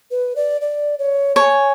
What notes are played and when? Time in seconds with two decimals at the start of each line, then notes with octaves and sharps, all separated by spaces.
0.11 B4
0.36 D5
0.61 D5
0.99 C#5
1.36 C#5 A5
1.40 G#5